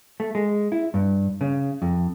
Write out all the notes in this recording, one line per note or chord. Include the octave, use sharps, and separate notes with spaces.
A3
G#3
E4
G2
C#3
F2